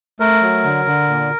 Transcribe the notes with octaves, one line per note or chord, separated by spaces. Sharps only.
A3 A#4
F#3
D3
D3
A#2